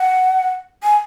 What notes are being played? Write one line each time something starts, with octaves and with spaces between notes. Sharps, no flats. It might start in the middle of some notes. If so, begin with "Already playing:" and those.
Already playing: F#5
G#5